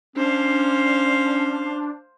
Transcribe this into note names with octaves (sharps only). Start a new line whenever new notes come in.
C#4 D4 C5 F5